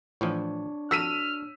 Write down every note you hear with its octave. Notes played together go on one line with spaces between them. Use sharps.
A2 E3 F3 D4 C#5
F#4 A4 E6 F6 B6 D#7